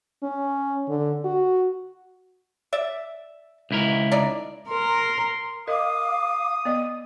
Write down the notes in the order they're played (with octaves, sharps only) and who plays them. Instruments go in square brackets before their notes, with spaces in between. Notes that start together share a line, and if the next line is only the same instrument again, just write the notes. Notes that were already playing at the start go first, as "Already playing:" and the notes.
[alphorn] C#4
D3
F#4
[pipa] D5 E5
[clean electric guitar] C#2 E4 A#4
[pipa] D4 D#4 D5
[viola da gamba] A#4 [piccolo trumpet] C6
[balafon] A#4 D#5 [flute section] F5 D6 [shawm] D#6
[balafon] B3 D5 D#5